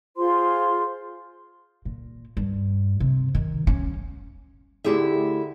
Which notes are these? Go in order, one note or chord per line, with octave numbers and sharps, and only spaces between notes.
F4 G#4 C5 C6
A#2
G2
C3
D#3
C#4
D2 D3 E4 G4 G#4 E5